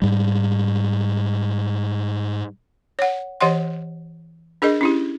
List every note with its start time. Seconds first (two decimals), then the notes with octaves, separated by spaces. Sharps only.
0.02 G#2 G3
2.99 C#5 F#5
3.41 E3 G4 C#5 D#5 F#5 C6
4.62 D4 G#4 A#4 D#5
4.81 C#4 E4 G4